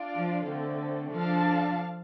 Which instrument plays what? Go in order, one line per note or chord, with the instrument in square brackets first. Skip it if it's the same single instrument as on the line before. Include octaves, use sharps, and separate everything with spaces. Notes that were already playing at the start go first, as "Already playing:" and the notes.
Already playing: [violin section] D4 F4 D5 F5
[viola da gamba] F3
[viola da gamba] D3 [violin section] A3 C4 A4
[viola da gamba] F3 [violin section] D4 A4 F5 A5